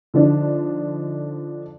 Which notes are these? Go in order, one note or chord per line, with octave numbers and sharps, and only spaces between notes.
D3 F3 D4 D#4